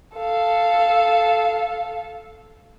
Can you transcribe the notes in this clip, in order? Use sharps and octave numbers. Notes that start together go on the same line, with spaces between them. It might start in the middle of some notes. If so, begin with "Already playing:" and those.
A4 F5